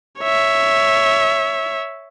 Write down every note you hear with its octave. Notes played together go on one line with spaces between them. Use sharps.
C#5 E5